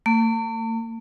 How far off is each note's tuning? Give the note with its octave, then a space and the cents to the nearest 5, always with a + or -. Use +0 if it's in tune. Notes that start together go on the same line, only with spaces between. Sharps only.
A3 +45